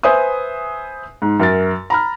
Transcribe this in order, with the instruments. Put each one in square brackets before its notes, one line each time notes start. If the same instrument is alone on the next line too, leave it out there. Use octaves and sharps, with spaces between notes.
[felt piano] B4 C5 E5 G#5 D#6
G#2
F#2 A#4 A6
A#5 B5 F6